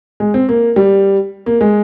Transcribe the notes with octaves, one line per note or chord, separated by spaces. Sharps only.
G#3
C4
A#3
G3
A#3
G#3